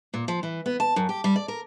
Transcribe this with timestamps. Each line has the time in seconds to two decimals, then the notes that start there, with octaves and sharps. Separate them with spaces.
0.14 A#2
0.28 F3
0.43 E3
0.66 B3
0.80 A5
0.96 F#2
1.09 G4
1.24 G3
1.36 D5
1.48 A#4